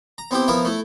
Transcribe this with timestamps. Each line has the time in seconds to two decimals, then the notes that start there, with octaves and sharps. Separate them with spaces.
0.18 A#5
0.31 B3 C4 E4 G4
0.48 F3 B3 E4 A#4 E5 B5
0.65 A3 E4